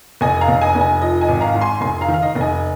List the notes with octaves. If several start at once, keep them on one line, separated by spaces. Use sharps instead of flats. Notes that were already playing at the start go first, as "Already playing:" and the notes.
F1 D#5 G#5
F5 A#5
F1
D#5 G#5
F1
D#5 G#5
F3 D#5
D#5 G#5
G#1
F5 A#5
G#2
G#5 C6
F1 G#5 C6
F5 A#5
D#3
F5
D#5
F1
D#5 G#5